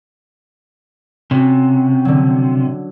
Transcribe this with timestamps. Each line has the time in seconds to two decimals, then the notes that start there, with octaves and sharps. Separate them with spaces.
1.31 C3 C#4 F#4
2.05 D3 F#3